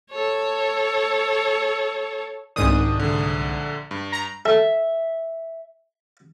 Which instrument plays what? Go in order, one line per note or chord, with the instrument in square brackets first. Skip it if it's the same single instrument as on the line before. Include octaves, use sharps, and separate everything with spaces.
[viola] A4 C#5
[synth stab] C2 G#2 D#6 [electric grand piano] D#3 D4
[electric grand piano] A#1 D3
G2
[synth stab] A#5
[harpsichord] A4 [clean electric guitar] E5